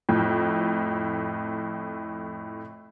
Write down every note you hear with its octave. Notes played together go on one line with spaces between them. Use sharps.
F2 A2